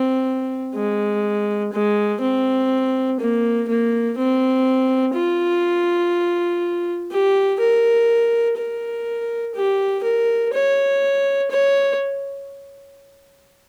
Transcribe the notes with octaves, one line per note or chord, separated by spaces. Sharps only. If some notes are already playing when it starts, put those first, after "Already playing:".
Already playing: C4
G#3
G#3
C4
A#3
A#3
C4
F4
G4
A#4
A#4
G4
A#4
C#5
C#5